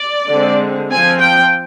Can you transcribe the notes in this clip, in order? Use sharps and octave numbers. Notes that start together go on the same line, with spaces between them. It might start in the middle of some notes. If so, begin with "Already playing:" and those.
Already playing: D5
D3 G#3 C4
F3 C4 G#5
G5